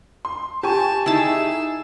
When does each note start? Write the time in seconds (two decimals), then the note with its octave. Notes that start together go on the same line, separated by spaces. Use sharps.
0.25 C6
0.63 G4 G#5 A5 C#6 E7
1.06 D#4 E4 G#4 A5 E6